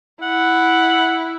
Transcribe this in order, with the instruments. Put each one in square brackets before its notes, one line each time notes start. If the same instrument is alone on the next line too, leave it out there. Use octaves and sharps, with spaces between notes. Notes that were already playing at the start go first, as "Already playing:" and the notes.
[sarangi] E4 [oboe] F#5